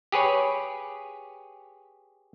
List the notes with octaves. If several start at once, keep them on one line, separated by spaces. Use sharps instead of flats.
G4 G#4 B4 C#5